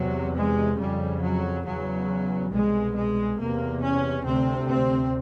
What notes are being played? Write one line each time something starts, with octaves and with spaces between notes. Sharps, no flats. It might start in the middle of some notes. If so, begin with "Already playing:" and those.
Already playing: E2 C3 F#3
G#3
F2 C#3 G3
F#3
E2 C#3 F#3
C2 B2 G#3
G#3
E2 C3 A#3
C#4
D2 C3 C4
C4